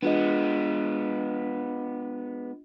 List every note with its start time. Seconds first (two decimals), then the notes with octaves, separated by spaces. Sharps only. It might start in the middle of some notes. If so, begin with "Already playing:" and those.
0.03 G#3 B3 D4 F4 D#5